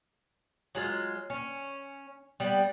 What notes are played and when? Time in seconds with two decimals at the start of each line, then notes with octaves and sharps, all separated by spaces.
0.75 F#3 G#3 F4
1.30 C#4
2.40 G3 B3